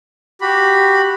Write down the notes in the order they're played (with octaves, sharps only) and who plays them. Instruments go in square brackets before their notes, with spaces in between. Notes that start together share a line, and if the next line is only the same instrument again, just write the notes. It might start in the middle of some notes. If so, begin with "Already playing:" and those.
[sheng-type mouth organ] F#4 G4 B5